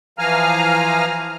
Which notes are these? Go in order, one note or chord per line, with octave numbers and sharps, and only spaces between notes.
E3 F3 F5 G#5 A#5 F6